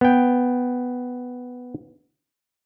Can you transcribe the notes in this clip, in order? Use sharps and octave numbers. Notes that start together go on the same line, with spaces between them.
B3 G5